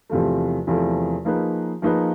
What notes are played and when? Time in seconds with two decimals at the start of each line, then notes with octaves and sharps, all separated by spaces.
0.10 E2 C3 F3 A3
0.67 E2 C3 F3 A3
1.25 F3 A#3 D#4 G#4 B4
1.82 F3 A#3 D#4 G#4 B4